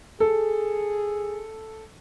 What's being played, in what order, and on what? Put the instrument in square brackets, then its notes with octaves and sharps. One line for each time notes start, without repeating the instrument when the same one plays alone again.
[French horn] G#4 [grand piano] A4